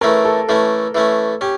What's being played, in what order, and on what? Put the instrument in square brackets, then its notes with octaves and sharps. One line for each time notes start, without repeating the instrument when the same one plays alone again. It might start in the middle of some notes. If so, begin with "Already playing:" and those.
[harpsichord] E3 A3 C#4 [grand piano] A#4
[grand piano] A4
[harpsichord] E3 A3 C#4
E3 A3 C#4
[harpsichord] C#4 [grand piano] G4